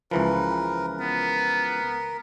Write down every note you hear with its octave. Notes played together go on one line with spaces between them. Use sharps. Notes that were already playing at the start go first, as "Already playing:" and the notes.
C#2 E3 F3 A#4 B4
B3 A#4